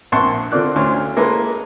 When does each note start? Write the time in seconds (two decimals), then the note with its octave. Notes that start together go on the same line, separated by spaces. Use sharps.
0.12 A#1 C4 F#5 A5 C6 C#6
0.52 D3 C4 F4 D5 F#6
0.76 D2 C#4 C5 F5
1.17 G#3 A#3 A4 B4 C5